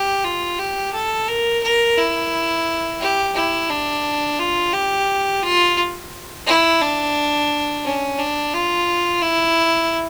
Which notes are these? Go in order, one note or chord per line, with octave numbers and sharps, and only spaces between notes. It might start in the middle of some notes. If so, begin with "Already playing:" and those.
Already playing: G4
F4
G4
A4
A#4
A#4
E4
G4
E4
D4
F4
G4
F4
E4
D4
C#4
D4
F4
E4